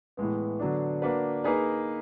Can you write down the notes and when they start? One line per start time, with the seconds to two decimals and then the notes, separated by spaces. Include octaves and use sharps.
0.17 A2 E3 G#3 B3
0.59 D3 F#3 B3 D4
1.02 A#3 D4 F#4 B4
1.44 A#3 D#4 G#4 B4